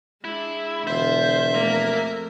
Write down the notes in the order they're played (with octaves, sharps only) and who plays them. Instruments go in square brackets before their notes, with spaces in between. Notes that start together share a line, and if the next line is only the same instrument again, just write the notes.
[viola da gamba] G#3 D4 [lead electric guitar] E4
[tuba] E1 [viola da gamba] D3 F4 [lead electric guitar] C5 [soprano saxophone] E5
[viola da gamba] F2 A3 A#4 [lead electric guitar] A#3